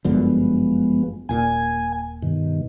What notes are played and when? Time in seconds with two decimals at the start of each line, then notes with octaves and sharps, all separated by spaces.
0.05 G1 F#2 D3 F3 G#3 B3
1.29 D#1 A#2 G#5
2.23 G2 B2 D#3